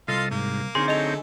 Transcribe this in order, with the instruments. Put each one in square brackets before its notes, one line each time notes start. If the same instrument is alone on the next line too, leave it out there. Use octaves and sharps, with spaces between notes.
[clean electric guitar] C2 [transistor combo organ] F4 A4 D#5 [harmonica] F5 C6
[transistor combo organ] G#2 [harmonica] A#3
[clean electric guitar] D3 G#4 [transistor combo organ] C4 D#4 C#5 [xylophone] C6
[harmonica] F#3 A3 [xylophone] D#5 F7